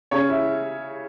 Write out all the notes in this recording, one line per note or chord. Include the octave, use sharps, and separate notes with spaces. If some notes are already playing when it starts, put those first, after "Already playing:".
C#3 C#4 C#5
E4 E5